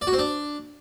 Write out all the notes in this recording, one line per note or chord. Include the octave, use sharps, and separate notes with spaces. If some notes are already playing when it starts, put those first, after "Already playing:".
D5
F#4
C4
D4